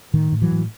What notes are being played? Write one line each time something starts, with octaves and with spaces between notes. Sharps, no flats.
A2 D#3
A2
E3 F#3
A2